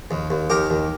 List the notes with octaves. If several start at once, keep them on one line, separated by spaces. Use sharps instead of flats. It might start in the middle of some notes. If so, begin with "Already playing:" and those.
D#2
D#2
D#2 G4 A#4
D#2